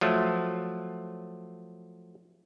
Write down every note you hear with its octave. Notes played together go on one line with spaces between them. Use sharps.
F3 F#3 A3